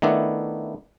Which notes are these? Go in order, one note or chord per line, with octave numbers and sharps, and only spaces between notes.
D#3 A3 B3 D4 E4